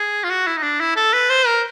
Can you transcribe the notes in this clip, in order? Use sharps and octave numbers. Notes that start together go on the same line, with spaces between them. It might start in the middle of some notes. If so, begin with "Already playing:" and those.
Already playing: G#4
F4
F#4
E4
D#4
D4
E4
A4
B4
C5
A#4